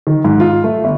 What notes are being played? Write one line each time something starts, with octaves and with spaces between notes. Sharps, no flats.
D#3
G#2
F4
A3
G1